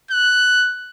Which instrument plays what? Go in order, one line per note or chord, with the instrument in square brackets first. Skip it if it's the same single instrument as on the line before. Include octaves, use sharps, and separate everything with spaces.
[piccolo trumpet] F#6